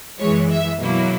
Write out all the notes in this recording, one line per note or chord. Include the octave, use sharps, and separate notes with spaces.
F#2 E3 G#3 C#5
E5
B2 F#3 A#3 E4